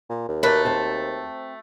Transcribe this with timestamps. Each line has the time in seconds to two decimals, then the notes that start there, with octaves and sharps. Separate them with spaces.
0.10 A#2
0.28 D#2
0.43 F#3 A3 A#4 B4 D5
0.65 C4 C5 A5